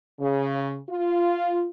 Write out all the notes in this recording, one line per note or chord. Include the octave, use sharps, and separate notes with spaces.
C#3
F4